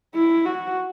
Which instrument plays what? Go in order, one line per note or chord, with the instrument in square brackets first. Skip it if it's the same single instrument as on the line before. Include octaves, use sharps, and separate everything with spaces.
[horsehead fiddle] E4
F#4